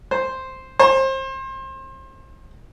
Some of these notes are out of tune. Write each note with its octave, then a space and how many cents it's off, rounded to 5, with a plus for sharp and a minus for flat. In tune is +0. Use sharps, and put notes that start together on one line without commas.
C5 +0
C5 +30